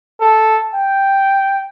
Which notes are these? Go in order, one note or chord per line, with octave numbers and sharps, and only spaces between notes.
A4
G5